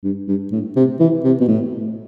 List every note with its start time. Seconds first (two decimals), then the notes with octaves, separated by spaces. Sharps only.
0.04 G2
0.28 G2
0.52 A2
0.76 C3
1.00 E3
1.24 C3
1.41 B2
1.48 A2